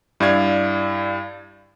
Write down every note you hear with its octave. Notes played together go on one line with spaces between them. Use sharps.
G2 E4 D5 F5 G#6